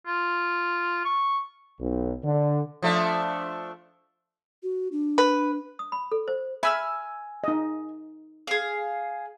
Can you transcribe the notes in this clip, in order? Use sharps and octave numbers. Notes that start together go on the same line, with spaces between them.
F4
C#6
B1
D3
F3 A3 D4
F#4
D4
B4
D#6
B5
A4
C5
E5 G#5 B5 E6 F6
D#4 D#5
G#4 F5